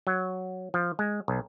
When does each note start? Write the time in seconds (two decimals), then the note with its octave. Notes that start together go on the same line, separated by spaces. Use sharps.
0.07 F#3
0.74 F3
0.99 G#3
1.28 B1